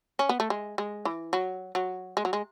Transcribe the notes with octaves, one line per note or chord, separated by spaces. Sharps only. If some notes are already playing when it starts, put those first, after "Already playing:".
C#4
B3
A3
G#3
G#3
E3
F#3
F#3
G#3
F#3
G#3